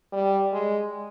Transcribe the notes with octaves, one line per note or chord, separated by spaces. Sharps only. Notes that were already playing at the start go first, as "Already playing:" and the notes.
G3
G#3